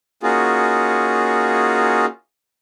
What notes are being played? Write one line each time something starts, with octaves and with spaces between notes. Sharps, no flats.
A#3 C#4 D#4 F4 F#4 G#4